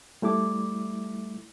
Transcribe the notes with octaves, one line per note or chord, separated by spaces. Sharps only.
G3 A3 E4 D6